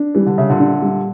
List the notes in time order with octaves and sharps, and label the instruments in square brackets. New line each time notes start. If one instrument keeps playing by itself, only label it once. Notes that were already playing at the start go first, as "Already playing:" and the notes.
Already playing: [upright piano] D4
[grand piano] E3 [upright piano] G3
[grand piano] D3
[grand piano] C#3 [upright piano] E5
[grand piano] A#2 D3
[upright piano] D4
G3